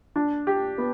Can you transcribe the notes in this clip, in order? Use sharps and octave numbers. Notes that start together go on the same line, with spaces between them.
D4
G4
B3